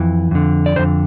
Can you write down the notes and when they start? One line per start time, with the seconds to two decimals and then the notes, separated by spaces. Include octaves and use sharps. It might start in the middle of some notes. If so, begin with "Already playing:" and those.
Already playing: F2 E3
0.31 F2 D3
0.66 D5
0.76 F2 D3 C5